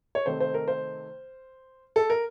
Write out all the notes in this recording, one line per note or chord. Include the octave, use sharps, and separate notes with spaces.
C#5
C3 D#3 A3 C4 C5
C5
A#4
C5
A4
A#4